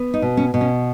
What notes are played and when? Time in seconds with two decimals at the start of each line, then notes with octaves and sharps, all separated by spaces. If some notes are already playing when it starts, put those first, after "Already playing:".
Already playing: B3
0.14 D#4
0.22 B2
0.37 C#4
0.54 B2
0.61 C#4